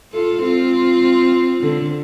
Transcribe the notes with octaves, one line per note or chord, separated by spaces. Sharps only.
F4 A4
C4 F4
D3